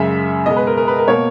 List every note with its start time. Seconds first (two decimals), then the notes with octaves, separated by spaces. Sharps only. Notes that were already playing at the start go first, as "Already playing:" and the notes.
Already playing: F#2 C#3 G#3 E5
0.46 B2 G#3 D#5
0.56 B4
0.67 A#4
0.78 A#4
0.88 B4
0.99 A#4
1.08 B2 A#3 C#5